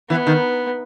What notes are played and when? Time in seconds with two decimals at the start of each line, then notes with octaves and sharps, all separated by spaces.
0.10 E3 B3
0.27 D#3